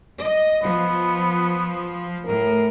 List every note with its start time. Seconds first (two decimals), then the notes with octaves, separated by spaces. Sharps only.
0.20 D#5
0.63 F3 B3
2.26 A2 A#4